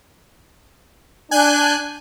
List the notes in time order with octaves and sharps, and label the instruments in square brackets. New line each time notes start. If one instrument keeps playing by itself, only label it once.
[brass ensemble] D4 [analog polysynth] G#5 F#6 G6